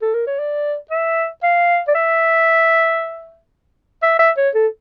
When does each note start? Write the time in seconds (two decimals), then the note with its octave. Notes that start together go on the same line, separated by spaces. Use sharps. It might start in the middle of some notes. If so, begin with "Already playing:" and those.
0.02 A4
0.14 A#4
0.27 C#5
0.39 D5
0.91 E5
1.43 F5
1.88 D5
1.95 E5
4.03 E5
4.19 E5
4.37 C#5
4.55 A4